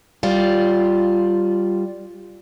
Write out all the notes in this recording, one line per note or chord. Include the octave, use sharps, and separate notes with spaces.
G3 F4